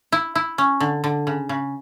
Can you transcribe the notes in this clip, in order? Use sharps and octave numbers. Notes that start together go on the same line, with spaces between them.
E4
E4
C#4
D3
D3
C#3
C#3